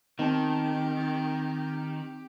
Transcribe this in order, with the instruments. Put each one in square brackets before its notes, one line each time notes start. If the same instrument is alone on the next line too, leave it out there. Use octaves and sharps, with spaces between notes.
[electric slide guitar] D#3 [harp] C4 A5 G6 [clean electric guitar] D#4 [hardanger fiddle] G4